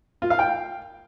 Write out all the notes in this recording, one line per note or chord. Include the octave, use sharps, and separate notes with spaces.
F4
F5
G5